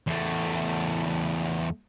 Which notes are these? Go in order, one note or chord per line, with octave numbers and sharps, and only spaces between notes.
E2 A3